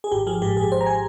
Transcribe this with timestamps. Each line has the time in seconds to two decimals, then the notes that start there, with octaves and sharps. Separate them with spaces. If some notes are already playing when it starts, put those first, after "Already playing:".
0.04 G#4
0.12 G#1 G4
0.27 F3 G#4
0.42 G#2 G4
0.57 G#2 G#4
0.72 G#1 C5
0.81 A#5
0.87 G#5